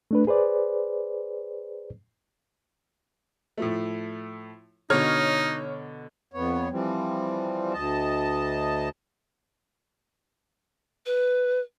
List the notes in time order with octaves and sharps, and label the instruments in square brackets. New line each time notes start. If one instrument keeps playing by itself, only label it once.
[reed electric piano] A3 D4 B4
G#4 B4 C5 D5
[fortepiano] A2 F3 A3
[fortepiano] B2 D3 [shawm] D#4 [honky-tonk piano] C#5 F6 G#6
[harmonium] F2 B3 C#5
E3 F3 G3 C4
D2 D#5 A5
[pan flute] B4